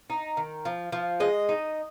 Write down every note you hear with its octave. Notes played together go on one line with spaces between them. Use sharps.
D#4
D#3
F3
F3
G#3 D#5
D#4